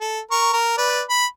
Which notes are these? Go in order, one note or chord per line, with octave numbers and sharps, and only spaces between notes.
A4
A#4 C#6
A#4
B4 D5
B5